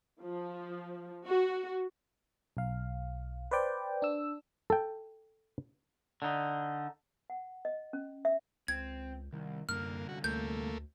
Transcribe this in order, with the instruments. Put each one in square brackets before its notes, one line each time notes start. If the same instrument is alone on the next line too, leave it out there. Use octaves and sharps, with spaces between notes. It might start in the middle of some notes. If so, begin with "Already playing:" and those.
[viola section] F3
F#4
[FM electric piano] B1 F5
B4 C5 D5 G5
D4 E6
[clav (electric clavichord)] A4 G5
[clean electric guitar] D3 D#4
[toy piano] F#5
D#5
C#4
E5
[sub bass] C#2 [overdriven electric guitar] C4 [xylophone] G#6
[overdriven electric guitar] C2 [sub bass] D#3
[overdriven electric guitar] C2 D3 [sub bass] F#2 [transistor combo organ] A#3 [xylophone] F6
[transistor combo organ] F#4
[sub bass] D2 [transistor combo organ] A3 A#3 [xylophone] G6